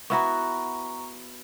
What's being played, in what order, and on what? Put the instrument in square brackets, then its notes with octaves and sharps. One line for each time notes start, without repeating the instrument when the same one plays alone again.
[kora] B3 E4 F#4 [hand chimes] A#5 C#6